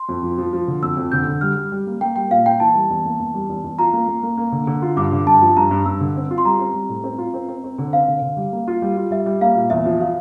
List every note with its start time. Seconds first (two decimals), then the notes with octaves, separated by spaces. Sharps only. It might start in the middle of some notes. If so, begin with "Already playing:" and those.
Already playing: C6
0.09 F2
0.23 F3
0.38 F3
0.53 F3
0.68 D3
0.83 F2 E6
0.97 F2
1.12 D3 G6
1.26 D3
1.41 G3 F6
1.56 G3
1.72 G3
1.87 A#3
2.01 A#3 G5
2.16 G3 G5
2.30 A#2 F5
2.45 A#3 G5
2.60 E3 A5
2.76 G3
2.90 E2
3.05 A#3
3.20 E2
3.34 G3
3.49 E2
3.64 E2
3.79 F4 A#5
3.93 A#3
4.08 A#3
4.23 A#3
4.37 A#3
4.52 D3
4.67 D3
4.82 F4
4.97 G2 D6
5.12 D3
5.26 G2 A5
5.42 F3
5.56 G2 A#5
5.71 G2
5.86 G2 E6
6.01 D3
6.16 C4
6.31 F4
6.38 C6
6.45 G3 A#5
6.59 C4
6.74 G3
6.89 A2
7.04 C4
7.18 F4
7.34 C4
7.48 C4
7.64 C4
7.79 D3
7.93 C4 F5
8.08 D3
8.22 D3
8.37 G3
8.52 A#3
8.68 F4
8.82 G3
8.97 F4
9.11 G3 E5
9.26 G3
9.41 A#3 F5
9.55 A#2
9.70 E2 E5
9.85 F3
10.01 F3 F5